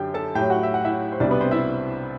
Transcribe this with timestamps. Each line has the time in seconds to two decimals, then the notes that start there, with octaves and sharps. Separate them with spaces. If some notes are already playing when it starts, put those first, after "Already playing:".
Already playing: F#2 D3 G4 G5
0.14 A4 A5
0.35 A2 F#3 G4 G5
0.50 F#4 F#5
0.63 E5
0.74 F#5
0.84 E4 E5
1.12 C5
1.20 C2 B2 G3 D4 D5
1.31 B3 B4
1.41 C4 C5
1.51 E4 E5